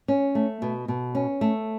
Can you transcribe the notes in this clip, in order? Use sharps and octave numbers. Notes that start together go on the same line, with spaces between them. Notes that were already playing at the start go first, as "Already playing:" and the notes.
C#4
A3
B2
B2
C#4
A3